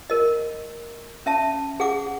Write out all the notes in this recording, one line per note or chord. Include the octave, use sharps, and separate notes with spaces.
A#4 D#5
C#4 E5 A5
G#4 F#5 D6